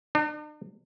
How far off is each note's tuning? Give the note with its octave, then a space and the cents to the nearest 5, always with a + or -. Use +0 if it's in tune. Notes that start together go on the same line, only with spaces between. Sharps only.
D4 +45